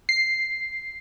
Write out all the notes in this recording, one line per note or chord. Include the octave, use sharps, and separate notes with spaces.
C7